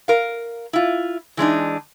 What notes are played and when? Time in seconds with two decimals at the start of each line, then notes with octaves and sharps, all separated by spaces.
0.08 A#4 F5
0.73 E4 F4
1.37 E3 G#3 D4 D#4